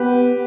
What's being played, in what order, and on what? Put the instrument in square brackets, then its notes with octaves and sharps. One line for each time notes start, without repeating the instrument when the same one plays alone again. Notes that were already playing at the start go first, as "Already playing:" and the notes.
Already playing: [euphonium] B3 [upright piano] G4 B4